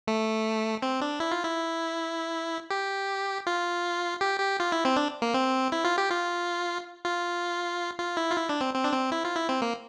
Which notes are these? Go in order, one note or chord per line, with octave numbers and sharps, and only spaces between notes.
A3
C4
D4
E4
F4
E4
G4
F4
G4
G4
F4
E4
C4
D4
A#3
C4
E4
F4
G4
F4
F4
F4
E4
F4
E4
D4
C4
C4
D4
C4
E4
F4
E4
C4
A#3